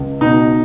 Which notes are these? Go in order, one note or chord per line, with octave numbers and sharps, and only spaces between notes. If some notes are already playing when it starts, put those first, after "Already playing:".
Already playing: C#2
B2 D#4